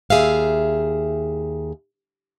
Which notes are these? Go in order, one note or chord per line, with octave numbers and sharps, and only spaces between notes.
D#2 G#4 E5 F5